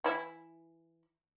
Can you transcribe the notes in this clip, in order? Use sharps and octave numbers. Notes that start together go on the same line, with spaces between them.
E3 E4